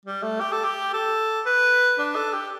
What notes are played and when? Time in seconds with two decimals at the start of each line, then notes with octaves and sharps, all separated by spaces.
0.05 G3
0.23 A3
0.40 G4
0.52 A4
0.64 G4
0.93 A4
1.46 B4
1.98 D4
2.16 A4
2.33 G4